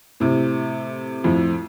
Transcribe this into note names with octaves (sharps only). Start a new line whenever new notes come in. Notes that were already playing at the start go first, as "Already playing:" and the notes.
A2 C3
F2 A2